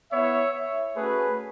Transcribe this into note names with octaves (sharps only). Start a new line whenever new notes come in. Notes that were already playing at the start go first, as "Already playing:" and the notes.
B3 E4 C#5 E5
A3 C#4 F#4 G#4 B4